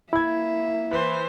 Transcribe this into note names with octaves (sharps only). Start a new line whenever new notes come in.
A#3 E4 E5 B5 G#6
E3 B4 C5